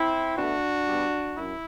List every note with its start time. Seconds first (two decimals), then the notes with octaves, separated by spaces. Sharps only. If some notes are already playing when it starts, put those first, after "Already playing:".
Already playing: C4 E4
0.36 B2 A3 D4 F#4
0.87 B2 G3
1.37 F#2 E4